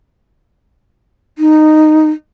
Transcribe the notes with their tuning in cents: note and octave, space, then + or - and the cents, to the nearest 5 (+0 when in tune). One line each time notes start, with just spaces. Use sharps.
D#4 -10